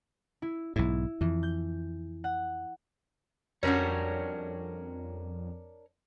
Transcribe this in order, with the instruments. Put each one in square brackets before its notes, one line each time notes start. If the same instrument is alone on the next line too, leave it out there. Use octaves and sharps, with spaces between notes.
[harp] E4
[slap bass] B1 G#2 [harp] E4
[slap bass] F2 [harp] E3
[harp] G6
F#5
[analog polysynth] F2 [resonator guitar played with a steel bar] G3 C#4 F#4 [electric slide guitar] D4 A#4 C#5